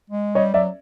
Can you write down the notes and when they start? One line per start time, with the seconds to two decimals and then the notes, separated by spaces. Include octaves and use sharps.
0.10 G#3
0.35 G3 C#5 D#5
0.54 F#3 D5 E5